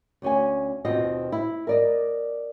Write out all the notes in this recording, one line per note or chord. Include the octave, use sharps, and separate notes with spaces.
D2 C#4 G#5
D#2 B2 C4 F4 C5 D#5
E4
A#4 D5 D#5